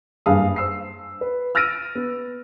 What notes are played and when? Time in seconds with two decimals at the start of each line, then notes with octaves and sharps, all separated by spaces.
0.26 F#1 G2 G3 G#4 F5 D#6
0.56 C5 E6 C7
1.21 B4
1.55 E6 F6 A6 A#6 D7 D#7
1.95 B3